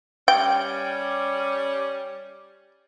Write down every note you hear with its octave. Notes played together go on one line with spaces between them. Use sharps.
G3 C#4 G5